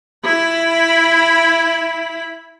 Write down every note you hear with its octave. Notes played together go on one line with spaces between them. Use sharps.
E4 B5